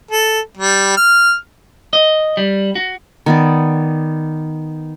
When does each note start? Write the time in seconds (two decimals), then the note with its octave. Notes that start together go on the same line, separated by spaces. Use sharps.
0.11 A4
0.57 G3
0.97 F6
1.93 D#5
2.37 G3
2.75 F#4
3.26 D#3 B3 D5